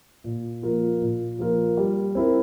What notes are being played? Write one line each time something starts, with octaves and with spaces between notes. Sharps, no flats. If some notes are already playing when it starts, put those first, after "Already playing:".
A#2
F3 A#3 F4 A#4
A#2
F3 A#3 F4 A#4
G3
C4 E4 A#4